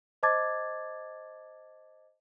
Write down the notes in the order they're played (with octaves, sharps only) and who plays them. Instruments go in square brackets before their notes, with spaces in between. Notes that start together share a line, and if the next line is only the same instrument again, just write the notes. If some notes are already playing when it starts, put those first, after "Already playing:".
[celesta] C5 D#5 A5 D6 G#6 A6